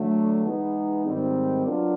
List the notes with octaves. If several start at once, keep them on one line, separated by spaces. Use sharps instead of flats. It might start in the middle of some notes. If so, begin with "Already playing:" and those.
Already playing: D3 F#3 A3
E3 G#3 B3 D#4
G#2 D#3 G3 C4
F#3 B3 D4 F4 A#4